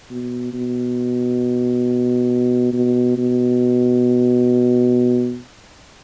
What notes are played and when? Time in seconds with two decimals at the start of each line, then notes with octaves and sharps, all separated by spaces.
0.11 B2
0.53 B2
2.73 B2
3.17 B2